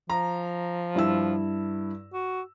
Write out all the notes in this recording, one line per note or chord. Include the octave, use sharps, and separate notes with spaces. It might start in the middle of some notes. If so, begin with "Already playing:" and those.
F3 A#5
G2 E4 E6
F#4